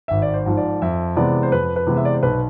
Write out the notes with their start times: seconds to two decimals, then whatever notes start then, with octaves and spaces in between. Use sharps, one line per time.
0.08 G#1 E5
0.22 D5
0.34 C5
0.46 G#2 F3
0.57 D5
0.82 F2 E5
1.16 C3 E3 G#3 B3 D5
1.43 C5
1.52 F2 B4
1.76 B4
1.87 C3 E3 G#3 B3
1.97 E5
2.05 D5
2.14 C5
2.23 B1 B4